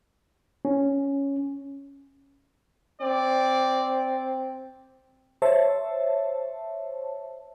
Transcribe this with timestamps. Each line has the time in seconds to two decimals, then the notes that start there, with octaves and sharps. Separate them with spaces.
0.65 C#4
3.01 C4 D5
5.42 C5 C#5 E5 A5